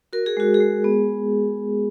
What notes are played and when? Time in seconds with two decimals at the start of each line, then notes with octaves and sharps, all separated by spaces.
0.13 F#4 A#4
0.26 G#4
0.37 G#3 F#4
0.54 G#4
0.60 G#3
0.84 B3